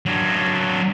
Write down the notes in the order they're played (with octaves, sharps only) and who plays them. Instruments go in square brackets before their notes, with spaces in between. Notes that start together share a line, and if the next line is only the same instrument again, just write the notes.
[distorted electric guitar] F#3 D4